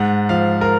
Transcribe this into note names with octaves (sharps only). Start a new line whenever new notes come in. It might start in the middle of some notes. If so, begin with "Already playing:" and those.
Already playing: G#2 F#5
F3 F5
A#4